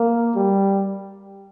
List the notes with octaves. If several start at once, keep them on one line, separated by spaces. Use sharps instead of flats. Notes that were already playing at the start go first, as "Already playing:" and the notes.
Already playing: A#3
G3